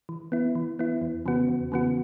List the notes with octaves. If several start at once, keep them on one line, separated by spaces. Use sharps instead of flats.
E3
B3 E4
E3
B3 E4
E2
C#3 E3 B3 F#4
E2
C#3 E3 B3 F#4